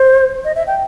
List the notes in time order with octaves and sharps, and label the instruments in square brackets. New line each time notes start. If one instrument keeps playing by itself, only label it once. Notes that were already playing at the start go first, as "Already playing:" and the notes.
Already playing: [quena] C5
D#5
E5
G5